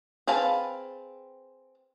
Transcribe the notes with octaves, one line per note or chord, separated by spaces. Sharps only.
C4 G#4 B4 F5 A5